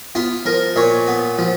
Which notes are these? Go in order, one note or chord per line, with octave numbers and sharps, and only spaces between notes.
B3 F4
F3 A#4
A#2 C#5
B3
F3